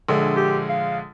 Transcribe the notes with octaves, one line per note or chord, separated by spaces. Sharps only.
A#1 D3 G#3
G4
F5